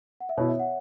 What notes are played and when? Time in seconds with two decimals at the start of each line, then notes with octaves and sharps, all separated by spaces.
0.20 F#5
0.29 E5
0.38 B2 B3 E4 C#5
0.49 E5
0.59 F#5